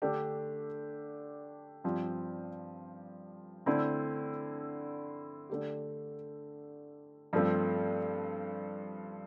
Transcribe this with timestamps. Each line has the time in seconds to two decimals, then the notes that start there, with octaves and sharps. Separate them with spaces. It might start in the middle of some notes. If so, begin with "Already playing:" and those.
0.02 D3 A3 D4 G4
1.84 G2 F3 C4 G4
3.66 D3 A3 C4 E4
5.50 D3 A3 D4 G4
7.33 G2 F3 A3 C4